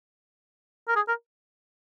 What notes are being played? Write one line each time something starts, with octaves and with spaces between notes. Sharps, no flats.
A#4
G#4
A#4